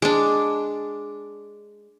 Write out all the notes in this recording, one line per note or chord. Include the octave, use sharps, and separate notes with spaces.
G#3 D4